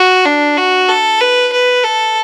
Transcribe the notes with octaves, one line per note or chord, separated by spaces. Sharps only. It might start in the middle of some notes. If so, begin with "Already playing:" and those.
Already playing: F#4
D4
F#4
A4
B4
B4
A4